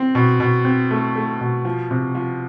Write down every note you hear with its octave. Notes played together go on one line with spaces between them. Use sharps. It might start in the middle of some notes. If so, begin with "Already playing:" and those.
Already playing: C4
B2
B2
C4
A3
A3
B2
F3
C3
F3